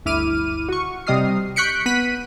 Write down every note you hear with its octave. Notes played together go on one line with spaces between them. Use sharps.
G1 D2 E4 D6 F6 D#7
F#4 C#6
C3 G3 D#5 D#6 F6 C7
C#6 F#6 G6 B6 C#7 D7
B3 F#6 B6 D#7